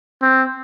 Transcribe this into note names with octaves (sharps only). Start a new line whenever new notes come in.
C4